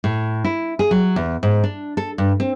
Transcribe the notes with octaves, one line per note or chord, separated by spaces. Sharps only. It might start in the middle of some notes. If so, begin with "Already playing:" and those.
A2
E4
G#4
F#3
E2
G#2
D4
A4
G2
C4